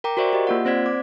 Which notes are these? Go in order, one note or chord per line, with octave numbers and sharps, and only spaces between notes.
A#4 G5 A#5 D6
F#4 A#4 C5 D5 E5 C#6
G4 D#5
A#3 F4 F#5
C4 C5 D5 G#6 B6
D6